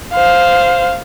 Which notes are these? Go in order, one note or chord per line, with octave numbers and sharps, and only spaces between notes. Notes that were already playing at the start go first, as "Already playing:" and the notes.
C5 F5